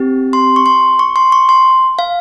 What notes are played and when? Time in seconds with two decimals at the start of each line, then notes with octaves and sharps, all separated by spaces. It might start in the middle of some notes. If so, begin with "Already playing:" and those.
Already playing: C4 G4
0.33 C6
0.56 C#6
0.66 C6
0.99 C#6
1.16 C6
1.32 C#6
1.49 C6
1.99 F5